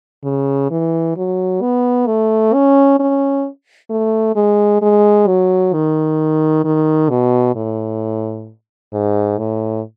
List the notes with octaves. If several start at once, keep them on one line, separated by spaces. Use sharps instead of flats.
C#3
E3
F#3
B3
A3
C#4
C#4
A3
G#3
G#3
F#3
D#3
D#3
B2
A2
G#2
A2